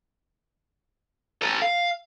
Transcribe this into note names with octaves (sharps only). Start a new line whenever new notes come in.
A4 B4
F5